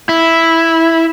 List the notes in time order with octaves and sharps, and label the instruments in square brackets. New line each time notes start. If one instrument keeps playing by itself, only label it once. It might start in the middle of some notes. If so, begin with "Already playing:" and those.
[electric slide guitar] E4